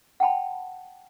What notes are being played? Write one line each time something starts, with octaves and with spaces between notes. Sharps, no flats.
F#5 G5 A5 B5